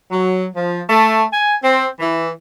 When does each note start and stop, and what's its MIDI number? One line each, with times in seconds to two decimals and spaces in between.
0.11 0.47 54
0.55 0.82 53
0.89 1.24 57
1.32 1.56 80
1.63 1.87 60
2.00 2.30 52